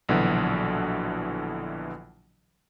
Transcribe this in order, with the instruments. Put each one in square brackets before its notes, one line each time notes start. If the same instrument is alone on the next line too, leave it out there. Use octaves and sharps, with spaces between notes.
[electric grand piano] A#1 B2 D3 E3 F#3